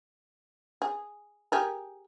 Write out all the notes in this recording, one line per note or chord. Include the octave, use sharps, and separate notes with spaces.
G#4
G4 G#4 A#4